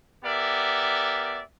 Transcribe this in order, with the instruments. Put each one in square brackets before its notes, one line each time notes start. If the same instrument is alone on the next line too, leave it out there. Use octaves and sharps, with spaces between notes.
[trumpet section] B3 G4 A#4 D5 E5